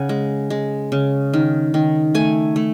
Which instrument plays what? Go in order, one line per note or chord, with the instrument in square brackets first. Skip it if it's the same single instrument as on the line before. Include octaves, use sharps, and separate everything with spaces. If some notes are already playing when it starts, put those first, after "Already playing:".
Already playing: [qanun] C#3 F#5 G#5
G#3
G#3
C#3
D#3
D#3
A3 G#5
A3